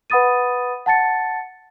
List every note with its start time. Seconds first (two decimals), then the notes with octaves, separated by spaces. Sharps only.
0.10 B4 F#5 B5 D#6 A6 D#7
0.86 F#5 A5 A6 C#7